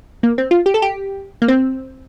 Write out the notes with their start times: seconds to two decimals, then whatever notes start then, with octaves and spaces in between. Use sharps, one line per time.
0.23 A#3
0.38 C4
0.51 F4
0.66 G4
0.74 A4
0.82 G4
1.42 A#3
1.48 C4